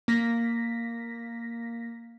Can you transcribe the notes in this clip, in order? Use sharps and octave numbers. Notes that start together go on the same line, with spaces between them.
A#3 A#6 B6